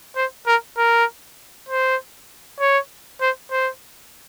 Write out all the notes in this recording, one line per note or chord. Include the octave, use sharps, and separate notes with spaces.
C5
A#4
A#4
C5
C#5
C5
C5